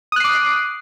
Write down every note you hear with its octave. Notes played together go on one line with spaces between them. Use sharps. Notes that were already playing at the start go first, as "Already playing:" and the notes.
D6 D#6 F#6 C7